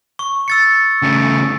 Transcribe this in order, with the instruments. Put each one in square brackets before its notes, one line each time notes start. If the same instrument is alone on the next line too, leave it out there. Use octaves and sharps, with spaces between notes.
[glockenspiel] C#6
E6 A6 C#7
[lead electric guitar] C#3 A3